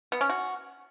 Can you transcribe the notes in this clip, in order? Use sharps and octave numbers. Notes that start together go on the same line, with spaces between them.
B3
C#4
F#4